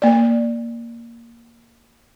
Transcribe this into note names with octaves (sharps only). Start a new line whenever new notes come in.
A#3 D5